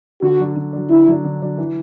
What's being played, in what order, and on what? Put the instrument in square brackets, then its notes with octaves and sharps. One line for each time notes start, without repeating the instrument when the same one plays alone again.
[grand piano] D3 [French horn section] F#4
[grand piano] F#3 D4
D3
F#3 D4
[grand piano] D3 [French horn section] E4
[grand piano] F#3 D4
D3
F#3 D4
E3